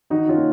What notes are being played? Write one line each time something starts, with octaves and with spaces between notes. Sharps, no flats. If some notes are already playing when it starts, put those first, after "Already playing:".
D#3 D#4 F#4
C#4 F4
A#3